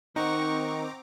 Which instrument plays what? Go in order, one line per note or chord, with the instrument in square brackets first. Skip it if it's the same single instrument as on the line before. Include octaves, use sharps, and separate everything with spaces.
[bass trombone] D#3 [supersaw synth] C4 A#5 D6 [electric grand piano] D#4 [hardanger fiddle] F#5 C#6